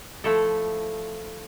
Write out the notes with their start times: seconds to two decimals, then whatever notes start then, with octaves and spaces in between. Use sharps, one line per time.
0.24 F3 A3 E4 A4